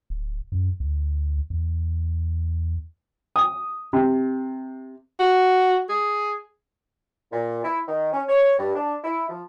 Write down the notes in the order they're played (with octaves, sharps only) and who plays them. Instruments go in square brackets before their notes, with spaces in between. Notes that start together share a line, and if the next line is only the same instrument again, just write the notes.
[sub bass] D1
F#2
D2
E2
[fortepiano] D#6
C3
[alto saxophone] F#4
G#4
[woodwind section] A#2
E4
D#3
C#4
C#5
G2
D4
E4
F3